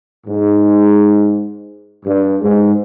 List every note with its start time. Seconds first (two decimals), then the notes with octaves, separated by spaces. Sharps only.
0.26 G#2
2.05 G2
2.41 G#2